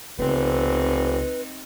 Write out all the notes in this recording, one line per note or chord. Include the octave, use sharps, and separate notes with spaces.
F1 C#2 B3 C4 D#4 B4